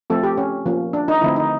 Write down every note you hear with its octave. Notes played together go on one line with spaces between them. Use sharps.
F3 A3 C4 A4
G4
C#4
F3 A#3 C#4
D4
D#4
D3 F3 A3 C4 E4
D#4